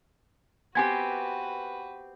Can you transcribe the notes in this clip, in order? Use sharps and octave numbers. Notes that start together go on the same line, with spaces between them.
B3 C4 F#4 G4 B4 G#5 G#6